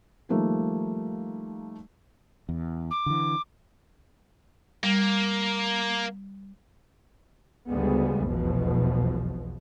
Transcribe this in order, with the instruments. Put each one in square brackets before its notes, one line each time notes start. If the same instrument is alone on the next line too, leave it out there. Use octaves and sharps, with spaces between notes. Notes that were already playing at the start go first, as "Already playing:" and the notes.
[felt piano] D#3 F3 G3 A3 A#3
[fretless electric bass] E2
[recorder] D6
[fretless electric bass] D3 E3
[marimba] G3 [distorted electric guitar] A#3
[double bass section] D2 C#3 G3 G#3 B3
F1 B1 E2 B2 F3